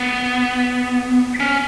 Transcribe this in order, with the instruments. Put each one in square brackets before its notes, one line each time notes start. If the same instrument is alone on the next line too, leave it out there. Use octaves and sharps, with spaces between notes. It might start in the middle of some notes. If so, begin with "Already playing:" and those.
Already playing: [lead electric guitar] B3
C#4